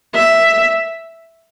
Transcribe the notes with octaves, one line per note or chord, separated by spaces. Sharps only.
E5